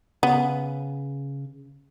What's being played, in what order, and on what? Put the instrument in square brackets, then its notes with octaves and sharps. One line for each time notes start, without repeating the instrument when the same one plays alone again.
[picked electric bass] C#3 [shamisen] B3